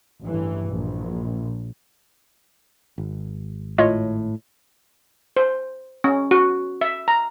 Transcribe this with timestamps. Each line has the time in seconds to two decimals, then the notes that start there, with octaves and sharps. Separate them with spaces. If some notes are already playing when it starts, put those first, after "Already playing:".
0.23 A1 G2 E3
0.70 A#1
2.98 G#1
3.78 A2 F4 C#5 D#5
5.37 C5
6.04 C#4
6.31 F#4
6.81 E5
7.08 A#5